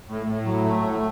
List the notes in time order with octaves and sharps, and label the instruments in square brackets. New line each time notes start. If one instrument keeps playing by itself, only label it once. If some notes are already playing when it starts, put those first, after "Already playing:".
[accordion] A2
A2
F#3
A3
A2